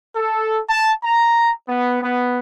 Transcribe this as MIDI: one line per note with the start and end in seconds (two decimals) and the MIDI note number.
0.16 0.60 69
0.69 0.92 81
1.04 1.50 82
1.69 2.02 59
2.03 2.38 59